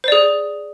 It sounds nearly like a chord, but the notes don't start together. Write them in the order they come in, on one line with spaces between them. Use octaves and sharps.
C5 D5 G#4